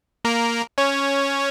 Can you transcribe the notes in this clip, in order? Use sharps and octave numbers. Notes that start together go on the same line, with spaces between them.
A#3 A#4
C#4 C#5